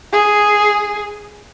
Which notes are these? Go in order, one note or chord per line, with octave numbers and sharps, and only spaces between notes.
G#4